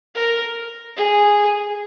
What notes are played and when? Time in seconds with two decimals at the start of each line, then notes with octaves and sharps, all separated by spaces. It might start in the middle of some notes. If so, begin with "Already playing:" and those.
0.15 A#4
0.97 G#4